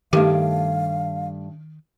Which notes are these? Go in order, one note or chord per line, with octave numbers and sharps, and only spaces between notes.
G2 D#3 A3 D4 G4 F5